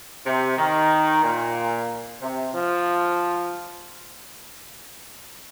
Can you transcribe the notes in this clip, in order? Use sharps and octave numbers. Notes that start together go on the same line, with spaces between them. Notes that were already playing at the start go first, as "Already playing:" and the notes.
C3
D#3
A#2
C3
F3